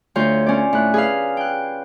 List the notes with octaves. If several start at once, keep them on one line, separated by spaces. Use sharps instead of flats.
D2 F4 C#5 G6
C#4 D5
A2 F#6
G#4 B4 F5
G5 F#6